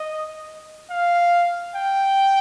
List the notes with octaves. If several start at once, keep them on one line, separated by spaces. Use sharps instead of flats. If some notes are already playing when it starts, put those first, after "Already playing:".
Already playing: D#5
F5
G5